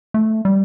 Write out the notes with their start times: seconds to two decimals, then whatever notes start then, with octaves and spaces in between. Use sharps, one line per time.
0.14 A3
0.45 G3